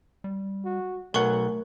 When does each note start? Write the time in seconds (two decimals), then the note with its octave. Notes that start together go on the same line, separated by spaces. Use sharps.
0.24 G3
0.65 F#4
1.14 B1 F#3 A3 A#4 F#5 C#6